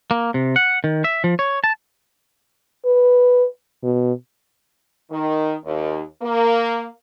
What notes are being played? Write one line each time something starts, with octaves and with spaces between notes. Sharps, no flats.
A#3
C3
F#5
D#3
E5
F3
C#5
A5
B4
B2
D#3
D#2
A#3